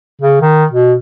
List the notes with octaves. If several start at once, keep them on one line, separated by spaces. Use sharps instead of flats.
C#3
D#3
B2